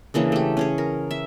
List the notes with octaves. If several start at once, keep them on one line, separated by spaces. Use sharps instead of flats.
C#3 E3 A#3 D4
A3 G4
C#4 G#4 C#5
A#4
E5